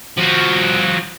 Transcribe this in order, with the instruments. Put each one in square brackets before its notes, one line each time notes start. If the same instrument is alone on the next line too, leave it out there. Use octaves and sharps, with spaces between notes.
[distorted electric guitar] F3 F#4